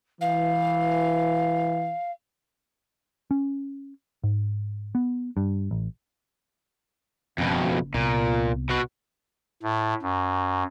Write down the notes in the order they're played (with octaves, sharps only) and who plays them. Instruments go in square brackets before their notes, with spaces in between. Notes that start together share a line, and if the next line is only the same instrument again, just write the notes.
[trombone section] E3 [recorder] F5
[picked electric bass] C#4
G#2
B3
G2
A1
[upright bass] F#1 [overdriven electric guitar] F2 B2
[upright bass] C2 B3 [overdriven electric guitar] A#2
[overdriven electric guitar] B2 F#4
[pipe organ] A2
F#2